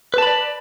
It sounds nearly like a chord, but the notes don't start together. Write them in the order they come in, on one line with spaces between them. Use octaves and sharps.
B4 A5 B5 D5